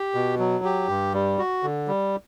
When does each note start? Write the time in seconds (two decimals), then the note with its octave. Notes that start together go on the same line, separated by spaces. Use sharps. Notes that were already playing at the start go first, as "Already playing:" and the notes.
Already playing: G4
0.15 B2
0.39 F#3
0.64 G4
0.89 G2
1.14 G3
1.39 F#4
1.63 D3
1.88 G3